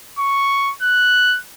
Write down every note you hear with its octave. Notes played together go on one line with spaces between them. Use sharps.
C#6
F#6